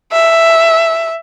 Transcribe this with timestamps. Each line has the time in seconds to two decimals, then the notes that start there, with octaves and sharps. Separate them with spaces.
0.12 E5